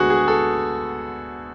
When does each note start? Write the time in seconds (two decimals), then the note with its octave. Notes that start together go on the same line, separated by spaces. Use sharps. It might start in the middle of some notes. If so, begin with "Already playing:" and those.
Already playing: D2 D3 G#3 B3 F#4 G#4
0.10 G#4
0.28 A4